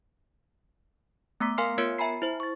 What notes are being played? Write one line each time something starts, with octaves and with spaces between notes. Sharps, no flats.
A3 B3 A#5 D6 B6
A#4 F5 G#5 C6 F6 C7
B3 F4 A#4 C#5 G#6 C#7
E5 G#5 A#5 B5 C7
E4 C5
C#6 A6